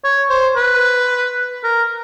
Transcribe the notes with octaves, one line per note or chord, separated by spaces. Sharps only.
C#5
C5
B4
A#4